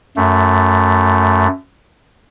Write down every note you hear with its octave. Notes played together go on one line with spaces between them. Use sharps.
F#2 A3